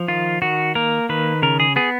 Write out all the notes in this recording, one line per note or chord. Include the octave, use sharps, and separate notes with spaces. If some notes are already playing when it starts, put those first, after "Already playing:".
Already playing: F3
D#3 F4
D#3 F#4
A#3 A#4
D#3 B4
C#3 A#4
G#4
B3 G#4